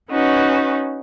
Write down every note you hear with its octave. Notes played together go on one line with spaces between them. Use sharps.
C#4 D#4 F#4 B4